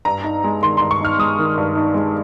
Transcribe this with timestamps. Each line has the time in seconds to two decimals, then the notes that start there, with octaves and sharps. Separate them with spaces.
0.05 G2 A#5
0.24 D#4
0.44 G#3
0.62 D#3 C6
0.77 G2 C6
0.91 C#6
1.01 D#4 F6
1.19 G#3 D#6
1.39 D#3
1.58 G2
1.75 D#4
1.94 G#3